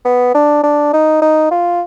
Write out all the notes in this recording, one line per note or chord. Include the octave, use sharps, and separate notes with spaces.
B3
D4
D4
D#4
D#4
F4